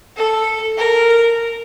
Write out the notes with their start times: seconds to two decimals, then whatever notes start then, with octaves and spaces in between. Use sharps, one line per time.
0.16 A4
0.77 A#4